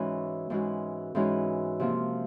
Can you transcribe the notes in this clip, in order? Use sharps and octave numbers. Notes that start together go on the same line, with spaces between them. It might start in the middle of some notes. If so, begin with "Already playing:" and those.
Already playing: G#2 E3 G#3 C#4 F#4
G#2 E3 G#3 C#4 F#4
G#2 E3 G#3 C#4 F#4
C3 F3 A#3